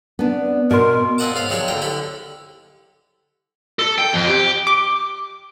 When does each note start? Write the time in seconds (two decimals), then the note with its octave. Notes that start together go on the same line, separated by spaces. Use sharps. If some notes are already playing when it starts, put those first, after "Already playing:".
0.19 B3 C4 D4
0.71 B2 A#4 D#5 C6
1.18 A#2 C4 D#5 F#5 A5 D6
1.34 C#2 G#2 F4 F5
1.49 D#3 F3 F#3 D4 G4 C#5
1.68 B1 A#2 D3 G5 A#5
1.82 C2 D3 G4 B5
3.79 A4
3.98 G5
4.13 F2
4.28 G4
4.67 D6